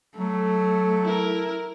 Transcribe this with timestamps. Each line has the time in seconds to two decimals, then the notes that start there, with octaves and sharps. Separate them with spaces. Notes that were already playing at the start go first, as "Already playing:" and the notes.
0.18 F#3 A3
1.03 E4 A#4